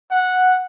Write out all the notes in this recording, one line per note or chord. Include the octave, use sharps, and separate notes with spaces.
F#5